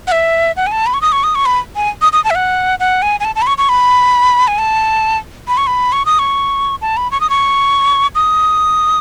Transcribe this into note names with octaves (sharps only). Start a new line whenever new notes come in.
F#5
E5
F#5
G#5
A5
B5
C#6
D#6
C#6
D#6
C#6
B5
G#5
D#6
D#6
A5
E5
F#5
F#5
G#5
G#5
A5
A5
B5
C#6
C#6
B5
G#5
A5
B5
C#6
B5
C#6
D#6
C#6
A5
B5
C#6
D#6
C#6
D#6